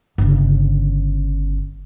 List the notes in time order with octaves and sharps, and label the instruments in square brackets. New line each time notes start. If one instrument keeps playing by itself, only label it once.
[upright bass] G1 C#3